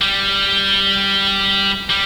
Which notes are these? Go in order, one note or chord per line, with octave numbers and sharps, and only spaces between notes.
G3
G3